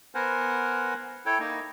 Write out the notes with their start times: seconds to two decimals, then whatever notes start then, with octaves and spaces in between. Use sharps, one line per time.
0.15 B3 A#4 C5 F#5 G#5
1.26 E4 A4 C#5 G5
1.40 A#3 D#4